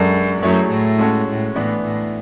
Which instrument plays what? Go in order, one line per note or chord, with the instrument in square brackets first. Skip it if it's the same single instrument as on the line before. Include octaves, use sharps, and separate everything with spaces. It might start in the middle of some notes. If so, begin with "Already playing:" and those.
Already playing: [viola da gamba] F#2 [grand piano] G#3 D4 A4 D5
[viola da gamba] F#2 [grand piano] F#3 A3 E4 G#4 C#5
[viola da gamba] A2
[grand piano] G#3 C#4 F#4 A4 C#5
[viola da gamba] A2
[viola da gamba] A2 [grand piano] E3 B3 D4
[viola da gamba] A2